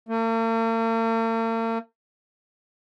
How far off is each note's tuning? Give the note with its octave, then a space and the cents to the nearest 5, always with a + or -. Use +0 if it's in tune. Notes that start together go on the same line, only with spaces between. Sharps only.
A#3 -45